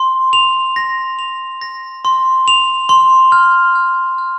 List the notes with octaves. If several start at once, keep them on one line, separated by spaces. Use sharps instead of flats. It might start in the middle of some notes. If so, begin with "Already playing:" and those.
Already playing: C6
F7
A#6
F7
A#6
C6
F7
C6
F6
F6
F6